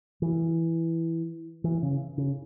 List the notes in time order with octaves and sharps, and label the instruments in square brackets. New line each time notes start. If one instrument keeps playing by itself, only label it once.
[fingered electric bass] E3
E3
C#3
C#3